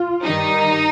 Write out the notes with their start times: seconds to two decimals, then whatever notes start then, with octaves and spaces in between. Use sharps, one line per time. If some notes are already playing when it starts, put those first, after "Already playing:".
Already playing: F4
0.23 G2 D#3 G3 D#4